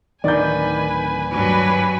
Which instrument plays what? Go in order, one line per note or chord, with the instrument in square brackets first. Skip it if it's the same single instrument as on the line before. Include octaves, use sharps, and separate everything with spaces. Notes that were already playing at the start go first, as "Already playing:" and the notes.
[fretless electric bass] D1 D#3 [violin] B4 G#5 [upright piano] D5 G6
[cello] G2 F#3 [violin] B4 G#5